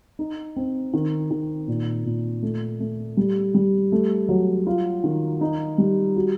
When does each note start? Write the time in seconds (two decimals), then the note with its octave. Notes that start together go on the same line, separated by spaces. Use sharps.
0.19 D#4
0.56 C4
0.93 D#3
1.31 D#3
1.68 A#2
2.05 A#2
2.42 A3
2.80 A3
3.17 G3
3.54 G3
3.92 A3
4.29 F#3
4.67 F4
5.04 D#3
5.41 D#4
5.78 G3
6.16 F#4